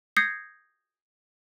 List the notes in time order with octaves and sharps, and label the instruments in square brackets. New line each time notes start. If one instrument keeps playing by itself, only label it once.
[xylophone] D#6 G6 G#6 A#6 C7 C#7